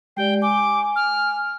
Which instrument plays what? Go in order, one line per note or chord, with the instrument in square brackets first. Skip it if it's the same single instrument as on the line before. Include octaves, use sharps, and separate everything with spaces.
[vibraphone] G#3 G4 D5 [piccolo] G5
[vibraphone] G#5 [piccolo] D6
[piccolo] F6